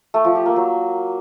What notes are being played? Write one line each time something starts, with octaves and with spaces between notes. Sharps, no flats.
A3
F3
G4
A#3
F#3